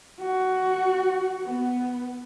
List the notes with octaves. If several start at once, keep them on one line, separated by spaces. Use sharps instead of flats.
F#4
B3